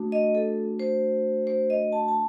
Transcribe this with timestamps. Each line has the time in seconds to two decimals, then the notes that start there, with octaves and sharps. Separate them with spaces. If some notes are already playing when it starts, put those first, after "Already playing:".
Already playing: A3 D4 F#4
0.12 D#5
0.35 A4
0.80 C5
1.47 C5
1.70 D#5
1.92 A5
2.08 A5